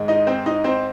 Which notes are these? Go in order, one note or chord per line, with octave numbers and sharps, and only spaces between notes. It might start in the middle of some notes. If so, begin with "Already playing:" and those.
Already playing: G#2 D#3 G#3
D#4 D#5
C4 C5
D#4 D#5
C4 C5